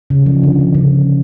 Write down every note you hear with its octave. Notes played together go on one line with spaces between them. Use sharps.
C#3
F3
D3
D3
C#3